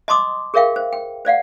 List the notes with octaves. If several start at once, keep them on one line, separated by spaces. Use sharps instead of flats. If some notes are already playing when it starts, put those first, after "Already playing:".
D#5 A5 C6 D6 D#6
G#4 A#4 C#5 E5 F5 G5
C5
G5
C5 D5 F5 F#5